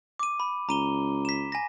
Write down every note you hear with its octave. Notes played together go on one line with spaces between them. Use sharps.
D6 D#7
B5
C#2 A#5 D#7 G7
B6 E7
G#5 A#6